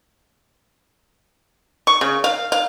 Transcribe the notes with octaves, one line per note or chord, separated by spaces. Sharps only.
C#6
C#3
F5
F5